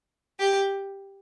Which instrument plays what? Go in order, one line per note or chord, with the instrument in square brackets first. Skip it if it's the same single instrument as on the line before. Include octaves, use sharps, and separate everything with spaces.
[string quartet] G4